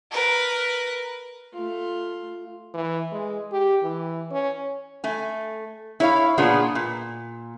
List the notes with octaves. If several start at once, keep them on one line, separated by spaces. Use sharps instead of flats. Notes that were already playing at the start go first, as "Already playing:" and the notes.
A#4 B4
A3 F4
E3
G#3
G4
E3
C#4
A3 G#5
E4 C#5 F5
A#2 B3 D4 F4 G#4
A#2